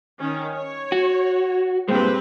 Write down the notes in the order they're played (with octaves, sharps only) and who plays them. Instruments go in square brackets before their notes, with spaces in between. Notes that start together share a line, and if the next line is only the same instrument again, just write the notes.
[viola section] D#3 C#4
C#5
[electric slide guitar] F#4
[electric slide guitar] G2 A#2 G#3 [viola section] C4 G4 B4